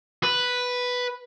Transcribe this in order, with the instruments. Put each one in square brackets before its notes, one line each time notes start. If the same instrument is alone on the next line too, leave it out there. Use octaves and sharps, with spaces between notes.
[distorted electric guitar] B4